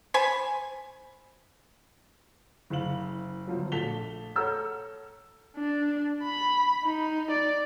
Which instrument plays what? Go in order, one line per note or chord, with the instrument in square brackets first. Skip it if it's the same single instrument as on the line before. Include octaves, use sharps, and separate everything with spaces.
[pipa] C5 G#5 B5
[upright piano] F#1 E4 F5 F#7
G1 F3 F#3
A#1 A3 A5 B6 F7 G7
A4 C#5 F#5 A#5 E6 G6
[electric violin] D4
B5
D#4
D5